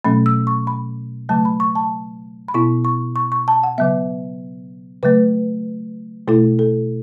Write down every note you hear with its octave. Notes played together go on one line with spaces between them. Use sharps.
B2 F#3 A3 C#4 B5
E6
C#6
B5
C#3 F#3 A3 A5
B5
C#6
A5
B5
B2 B3 E4 C#6
C#6
C#6
C#6
A5
F#5
C#3 F#3 B3 E5
C#3 F#3 A3 B4
B2 A3 E4 A4
A4